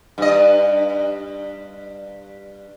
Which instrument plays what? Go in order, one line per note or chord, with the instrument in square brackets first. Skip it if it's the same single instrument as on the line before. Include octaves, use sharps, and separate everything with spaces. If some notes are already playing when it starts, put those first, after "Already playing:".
[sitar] G2 D#5